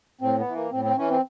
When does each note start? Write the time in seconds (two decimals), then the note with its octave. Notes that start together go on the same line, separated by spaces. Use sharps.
0.21 A2 C4
0.39 B3
0.47 E3
0.55 A#3
0.72 A2 C4
0.85 C4
0.97 E3 C#4
1.10 C4